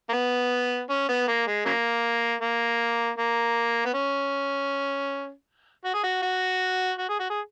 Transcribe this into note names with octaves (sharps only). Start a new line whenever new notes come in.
A#3
B3
C#4
B3
A#3
G#3
C#3 F#3 A#3
A#3
A#3
B3
C#4
F#4
G#4
F#4
F#4
F#4
G#4
F#4
G#4